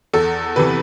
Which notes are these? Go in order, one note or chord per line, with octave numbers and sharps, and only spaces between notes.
E2 A4
C3 E3 B4